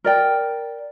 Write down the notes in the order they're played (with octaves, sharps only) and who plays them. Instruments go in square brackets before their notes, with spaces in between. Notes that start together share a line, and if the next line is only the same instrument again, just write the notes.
[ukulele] A#4 D5 G5